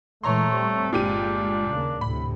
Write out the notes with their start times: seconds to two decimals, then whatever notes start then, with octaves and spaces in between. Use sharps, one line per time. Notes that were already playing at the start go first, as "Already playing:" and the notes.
0.23 A#2 E3 G#3 A3 C#5 A#5 C6
0.52 G3 C4
0.93 G1 A#2 G#3 D4 G4 D#7
1.70 D#2 C#3 A#3
2.01 D2 A2 C3 B5